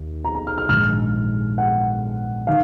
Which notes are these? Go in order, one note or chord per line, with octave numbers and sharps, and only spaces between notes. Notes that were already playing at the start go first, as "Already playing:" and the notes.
Already playing: D#2
A#5
A#5
F6
F6
A#1 G#2 D#3 F6
F#5
D#3 F5